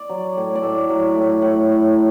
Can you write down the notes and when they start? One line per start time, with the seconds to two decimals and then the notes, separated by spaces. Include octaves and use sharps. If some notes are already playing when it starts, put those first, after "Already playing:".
Already playing: D5
0.09 F#3
0.37 A2
0.55 D5
0.63 A2 E5
0.89 F#3
1.16 A2
1.42 A2 F#5
1.68 A2
1.95 F#3